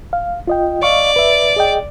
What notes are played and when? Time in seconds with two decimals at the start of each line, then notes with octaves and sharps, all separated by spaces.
0.13 F5
0.47 F4 D#5 G5
0.83 D5 D#5 F5 C#6
1.16 B4 E5
1.56 G#4 D#5 G5